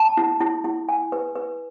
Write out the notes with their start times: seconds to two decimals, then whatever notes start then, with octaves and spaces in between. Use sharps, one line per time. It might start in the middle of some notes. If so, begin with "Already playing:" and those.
Already playing: A5
0.17 E4
0.40 E4
0.64 E4
0.89 G#5
1.12 B4
1.36 B4